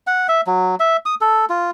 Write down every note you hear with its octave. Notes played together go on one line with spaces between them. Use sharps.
F#5
E5
F#3
E5
D#6
A4
F4